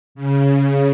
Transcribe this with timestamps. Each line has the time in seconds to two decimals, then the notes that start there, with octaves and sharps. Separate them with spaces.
0.15 C#3